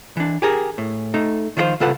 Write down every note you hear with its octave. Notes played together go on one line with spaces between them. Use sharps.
E3 D4
G4 G#4 A#4
A2
A3 D#4
D#3 F3 E4 F4 C5
C2 C#3 F4 A4 B4 F#5